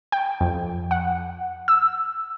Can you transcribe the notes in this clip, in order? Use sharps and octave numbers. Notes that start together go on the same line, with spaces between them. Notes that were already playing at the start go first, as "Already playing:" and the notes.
G5
F2
F#5
E6